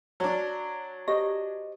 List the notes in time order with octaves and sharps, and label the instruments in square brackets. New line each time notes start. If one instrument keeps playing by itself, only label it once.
[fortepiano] F#3 D4
[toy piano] G4 [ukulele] C5 D#5